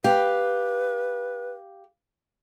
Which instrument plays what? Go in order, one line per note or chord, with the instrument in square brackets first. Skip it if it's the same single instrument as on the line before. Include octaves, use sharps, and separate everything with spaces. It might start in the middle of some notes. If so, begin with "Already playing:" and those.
[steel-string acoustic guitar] G4 F5 [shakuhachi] B4